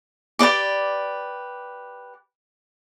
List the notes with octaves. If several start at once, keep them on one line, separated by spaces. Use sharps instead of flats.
G4 B4 D5 D6